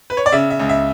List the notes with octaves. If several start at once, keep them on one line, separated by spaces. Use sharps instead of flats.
B4
C#5
D5
C#3 E5
E5
C#2
E5